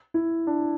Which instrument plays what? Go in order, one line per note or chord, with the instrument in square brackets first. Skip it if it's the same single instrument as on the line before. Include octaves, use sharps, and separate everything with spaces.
[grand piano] E4
D4